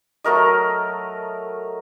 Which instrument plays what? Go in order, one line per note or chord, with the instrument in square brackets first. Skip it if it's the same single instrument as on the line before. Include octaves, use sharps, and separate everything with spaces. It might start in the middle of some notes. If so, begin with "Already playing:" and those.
[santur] F#3 A3 A#4 D#5